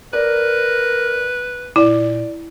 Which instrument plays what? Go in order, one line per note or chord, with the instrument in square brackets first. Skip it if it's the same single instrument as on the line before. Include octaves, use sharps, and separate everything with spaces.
[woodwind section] A#4 [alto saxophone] B4 [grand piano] D5
[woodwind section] A#2 [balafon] E4 [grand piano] D5